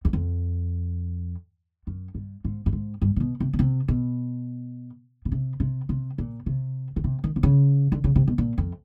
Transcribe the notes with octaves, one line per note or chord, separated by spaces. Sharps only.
E2
F2
F#2
G2
G#2
G2
G#2
G2
A#2
B2
C3
B2
C3
B2
B2
C3
C3
C3
A#2
C3
C#3
C3
D#3
C3
C#3
D3
C#3
C3
B2
A#2
F2